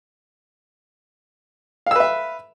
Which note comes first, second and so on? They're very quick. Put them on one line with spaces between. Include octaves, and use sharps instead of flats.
F5 E6 B4 E5